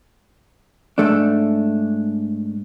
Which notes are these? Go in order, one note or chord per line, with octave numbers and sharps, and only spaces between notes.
G#2 A3 D4